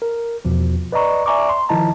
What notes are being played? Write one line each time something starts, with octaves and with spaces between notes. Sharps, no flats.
A#4
E2 B2 F3
B4 D5 D#5 A#5 C#6
D5 E5 G#5 A#5 C#6 D6
C6
D#3 F3 E4 D#5 A5 A#5